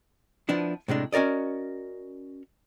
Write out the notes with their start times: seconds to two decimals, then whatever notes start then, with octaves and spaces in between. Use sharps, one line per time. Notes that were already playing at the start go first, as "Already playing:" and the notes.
0.49 F3 B3 D4 E4
0.88 A2 C3 G#3 D4
1.13 C#4 F#4 A#4 D5 D#5